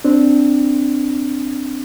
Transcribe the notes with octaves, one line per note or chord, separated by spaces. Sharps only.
C4 D4